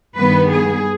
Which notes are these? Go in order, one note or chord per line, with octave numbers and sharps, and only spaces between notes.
G2 D#3 G3 B3 B4
G#4